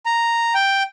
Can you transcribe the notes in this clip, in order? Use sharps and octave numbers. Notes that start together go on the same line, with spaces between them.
A#5
G5